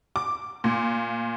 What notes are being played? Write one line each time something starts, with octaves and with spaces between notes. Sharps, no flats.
D6
A#2